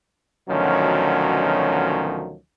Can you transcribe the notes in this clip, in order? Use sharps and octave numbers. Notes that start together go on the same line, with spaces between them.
D2 B2 D#3 F3 F#3 C#4